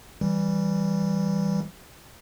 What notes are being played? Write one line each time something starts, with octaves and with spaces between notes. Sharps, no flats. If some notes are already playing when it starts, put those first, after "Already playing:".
E3 G3